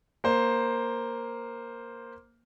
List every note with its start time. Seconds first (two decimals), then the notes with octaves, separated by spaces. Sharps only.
0.24 A#3 C5